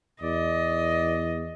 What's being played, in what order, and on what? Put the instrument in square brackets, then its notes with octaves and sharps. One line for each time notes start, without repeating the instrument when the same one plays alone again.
[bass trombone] E2 [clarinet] D5 [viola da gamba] D#5